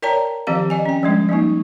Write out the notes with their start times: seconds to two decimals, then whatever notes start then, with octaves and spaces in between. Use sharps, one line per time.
0.02 A#4 C#5 D5 G5 A5 A#5
0.47 D#3 F3 C4 G4 F5 A5
0.70 D5 D#5 G#5
0.86 C#4 G5
1.03 F3 G3 G#3 D4
1.29 F3 G3 A#3 D#4